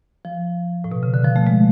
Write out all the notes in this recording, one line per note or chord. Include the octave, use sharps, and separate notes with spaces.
F3
A2
B2
C#3
D3
F3
A3
G#3